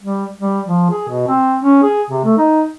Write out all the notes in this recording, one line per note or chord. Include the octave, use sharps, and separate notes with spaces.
G3
G3
F3
G#4
B2
C4
C#4
G#4
C3
A3
D#4